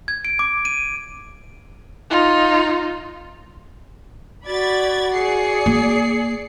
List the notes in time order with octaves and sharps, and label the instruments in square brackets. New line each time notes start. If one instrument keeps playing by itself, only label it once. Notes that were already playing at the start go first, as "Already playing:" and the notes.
[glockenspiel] G#6
D7
D6
D#7
[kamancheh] D#4 F4
[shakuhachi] F#4 [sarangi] D5 [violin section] B5 G#6 A6
[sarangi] G#4 [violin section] D5 C7 C#7
[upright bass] A#3